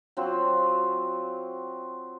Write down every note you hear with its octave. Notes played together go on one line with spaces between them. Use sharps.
F#3 C4 F4